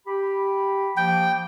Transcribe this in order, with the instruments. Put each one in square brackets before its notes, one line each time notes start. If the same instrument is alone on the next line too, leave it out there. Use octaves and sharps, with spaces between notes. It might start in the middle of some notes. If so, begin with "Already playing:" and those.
[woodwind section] G4 B5
[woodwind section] F3 A#3 [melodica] G5